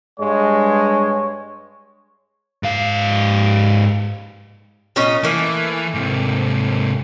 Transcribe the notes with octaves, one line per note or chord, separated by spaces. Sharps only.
G2 G#3 C#5
G#2 F5
A#2 C#4 D#5
E3 A3 A#3
G#2 C3